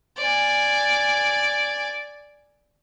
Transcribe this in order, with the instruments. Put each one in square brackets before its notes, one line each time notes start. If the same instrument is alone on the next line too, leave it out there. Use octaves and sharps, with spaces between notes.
[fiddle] D5 G#5